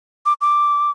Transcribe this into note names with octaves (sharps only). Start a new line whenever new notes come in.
D6
D6